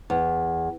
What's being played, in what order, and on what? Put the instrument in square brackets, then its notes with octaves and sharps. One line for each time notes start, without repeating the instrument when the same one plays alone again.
[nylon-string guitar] E2